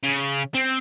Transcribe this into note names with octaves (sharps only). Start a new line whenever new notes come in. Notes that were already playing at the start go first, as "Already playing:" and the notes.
C#3
C4